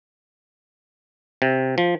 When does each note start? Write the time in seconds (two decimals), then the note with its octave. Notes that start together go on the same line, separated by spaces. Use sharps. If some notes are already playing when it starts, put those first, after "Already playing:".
1.42 C3
1.78 F3